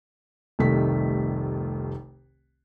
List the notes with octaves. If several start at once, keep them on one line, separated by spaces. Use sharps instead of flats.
F1 C2 D#3 A3 B6